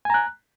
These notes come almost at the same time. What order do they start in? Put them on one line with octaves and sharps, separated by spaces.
G#5 A#5 F#6